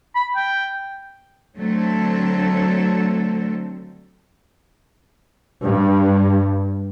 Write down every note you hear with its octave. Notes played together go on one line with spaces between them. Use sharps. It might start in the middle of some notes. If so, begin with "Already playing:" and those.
B5
G5
D3 F#3 A3 C4 A4
G2